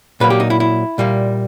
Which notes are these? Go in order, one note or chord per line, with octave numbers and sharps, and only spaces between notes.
A#2 F#3 A#3 B4
G4
D#4
E4
E4
A#2 G3 A#3